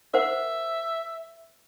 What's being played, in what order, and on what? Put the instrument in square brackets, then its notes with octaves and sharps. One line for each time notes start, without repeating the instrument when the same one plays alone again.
[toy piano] A#4 C5 F#5 [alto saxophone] E5